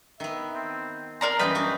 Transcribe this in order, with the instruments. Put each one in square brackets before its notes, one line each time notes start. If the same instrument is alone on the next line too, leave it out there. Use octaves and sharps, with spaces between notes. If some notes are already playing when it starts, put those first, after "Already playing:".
[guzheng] D#3 B3 [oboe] E5
[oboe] C4
[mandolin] A#4 D5 A#5 [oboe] C6
[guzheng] F#2 E3 G3 [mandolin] B4 G6 [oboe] D#5
[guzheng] D4 F#4